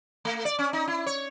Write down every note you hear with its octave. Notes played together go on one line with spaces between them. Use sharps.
A3
D5
C#4
D#4
E4
C#5